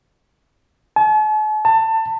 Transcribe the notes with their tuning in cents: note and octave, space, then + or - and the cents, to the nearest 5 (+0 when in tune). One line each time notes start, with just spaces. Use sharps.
A5 -45
A5 +25